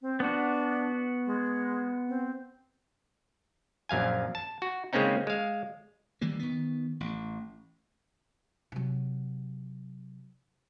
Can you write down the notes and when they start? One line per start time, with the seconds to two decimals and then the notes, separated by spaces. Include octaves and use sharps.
0.02 C4
0.20 B3 D4 F#4
1.26 G#3
2.08 C4
3.89 A#1 F#2 F5 G#5
4.35 A5
4.62 F#4
4.93 C#3 G#3 A#3 C4 C#4 D#4
5.27 G#3 F5
6.21 D#3 E3 G3 A#3
6.39 D#3 B3
7.00 A1
8.72 C3 F#3